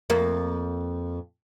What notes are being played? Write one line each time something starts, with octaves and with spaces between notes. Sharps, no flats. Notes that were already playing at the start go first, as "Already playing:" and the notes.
F2 A#3